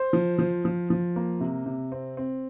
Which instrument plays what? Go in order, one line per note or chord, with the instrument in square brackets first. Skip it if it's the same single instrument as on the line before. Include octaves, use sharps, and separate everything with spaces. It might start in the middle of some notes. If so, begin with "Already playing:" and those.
Already playing: [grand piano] C5
F3
F3
F3
F3
A#3
C3
C3
C4
C4